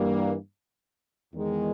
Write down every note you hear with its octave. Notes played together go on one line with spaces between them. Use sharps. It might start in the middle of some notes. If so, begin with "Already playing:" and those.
Already playing: G2 E3 G3 A#3
E2 D#3 G#3